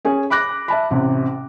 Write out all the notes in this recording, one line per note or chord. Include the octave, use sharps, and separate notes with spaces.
C#4 G#4
B5 D6 F#6 A#6
E5 A5 B5
A1 C3